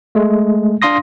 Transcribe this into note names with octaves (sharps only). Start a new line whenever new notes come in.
G#3 A3
D4 F5 C6 D#6 A#6